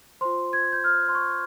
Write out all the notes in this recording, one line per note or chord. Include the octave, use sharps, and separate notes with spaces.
F4 C5 C6
G#6
G6
F6
C6
C#6